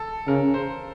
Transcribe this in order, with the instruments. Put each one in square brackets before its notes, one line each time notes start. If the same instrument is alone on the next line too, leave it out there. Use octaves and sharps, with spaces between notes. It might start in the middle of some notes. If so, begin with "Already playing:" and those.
Already playing: [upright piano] A4
[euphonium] C#3 [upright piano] A#4
[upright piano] C5